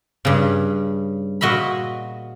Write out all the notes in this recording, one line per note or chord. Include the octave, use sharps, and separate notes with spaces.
G2 C#3
A#2 F#4 D#5 E5 B5